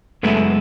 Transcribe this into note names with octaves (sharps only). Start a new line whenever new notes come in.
F#2 C#3 G#3 A3 B3 E4